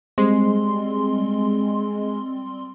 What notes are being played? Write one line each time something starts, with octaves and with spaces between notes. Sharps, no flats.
G3 G#3 C4 C6